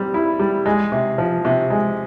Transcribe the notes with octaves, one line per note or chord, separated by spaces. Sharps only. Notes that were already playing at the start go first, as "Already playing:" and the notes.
Already playing: G3 C4
E4
G3
G#3
C3
F3
C3
G#3